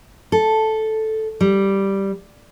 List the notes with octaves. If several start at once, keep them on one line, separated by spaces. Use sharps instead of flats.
A4
G3